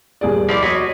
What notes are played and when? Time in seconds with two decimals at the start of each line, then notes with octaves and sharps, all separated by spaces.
0.21 D#1 G#4 D5
0.49 F3 E4 D5
0.63 F#4 C#5 D#5 B6